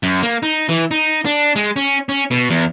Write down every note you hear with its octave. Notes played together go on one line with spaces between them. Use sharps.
F#2
A#3
D#4
E3
D#4
D4
G#3
C#4
C#4
B2
E2